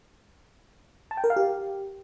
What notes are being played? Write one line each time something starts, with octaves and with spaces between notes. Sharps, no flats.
A5
G5
A#4
F5
G4